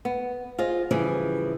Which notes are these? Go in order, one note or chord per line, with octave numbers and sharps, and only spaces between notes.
B3
F4 G#4 C5 D#5
C#3 E3 F3 G3 E4 G#4